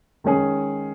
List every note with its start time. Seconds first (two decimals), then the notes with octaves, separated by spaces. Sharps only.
0.24 D#3 G#3 C#4 G#4